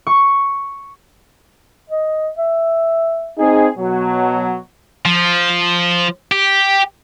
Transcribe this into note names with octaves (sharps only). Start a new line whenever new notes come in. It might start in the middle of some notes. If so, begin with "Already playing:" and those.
C#6
D#5
E5
C4 D#4 G#4
B2 F#3 F#5
F3
G4